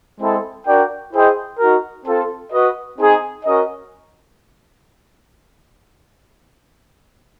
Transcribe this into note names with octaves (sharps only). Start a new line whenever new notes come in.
G#3 C4 E4 A4
D4 F#4 A#4 D5 G5
E4 G#4 C5 D#5 G5
D#4 F#4 A#4
C4 F4 A4
F#4 B4 D#5
C4 D#4 G#4
C#4 F#4 A#4 D#5